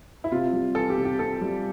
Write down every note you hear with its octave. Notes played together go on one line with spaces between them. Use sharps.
E4
C3 F4
G3
E3 A4
G4
C3
G4
C3 A4
G3